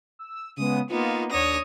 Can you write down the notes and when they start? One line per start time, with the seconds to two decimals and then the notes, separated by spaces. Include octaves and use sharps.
0.19 E6
0.57 C#3 G#3 B3 D#6
0.90 A#3 B3 D#4 F4
1.30 D#2 D4 C#5 D#6 A#6